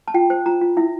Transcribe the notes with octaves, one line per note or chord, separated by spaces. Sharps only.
A5
F4 G5
C5
F4 A#5
F4
E4 E5